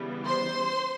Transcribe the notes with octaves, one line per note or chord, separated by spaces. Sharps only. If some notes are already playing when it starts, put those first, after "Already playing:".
Already playing: C#3 E3 G3 B3
C5 C6